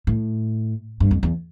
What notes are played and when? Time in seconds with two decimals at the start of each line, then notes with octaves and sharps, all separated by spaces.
0.07 A2
1.00 G2
1.11 F2
1.23 E2